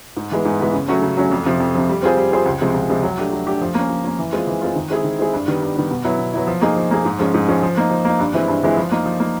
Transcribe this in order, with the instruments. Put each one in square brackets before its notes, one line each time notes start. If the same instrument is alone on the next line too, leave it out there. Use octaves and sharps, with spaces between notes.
[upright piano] G#2
E3 G#3 B3
G#2
E3 G#3 B3
C#3
F#3 A3 C#4 F#4
C#3
F#3 A3 C#4 F#4
F2
C3 F3
F2
C3 F3
G3
C4 F4 G#4 C5
G3
C4 F4 G#4 C5
C#2
C3 F3 G#3
C#2
C3 F3 G#3
F#3
A3 D4 G4
F#3
A3 D4 G4
F3
A#3 C#4
F3
A#3 C#4
E3
G#3 C4 F4
E3
G#3 C4 F4
D#3
G#3 C4 E4 G#4
D#3
G#3 C4 E4 G#4
G2
D#3 G3 B3
G2
D#3 G3 B3
B2
F#3 B3 E4
B2
F#3 B3 E4
F3
A#3 D#4 G#4
F3
A#3 D#4 G#4
G#2
F3 G#3 C#4
G#2
F3 G#3 C#4
F3
A#3 D#4
F3
A#3 D#4
G2
E3 G#3 C4 E4
G2
E3 G#3 C4 E4
F3
A#3 D#4
F3
A#3 D#4